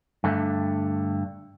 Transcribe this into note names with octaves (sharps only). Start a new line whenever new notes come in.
G2 D3 A3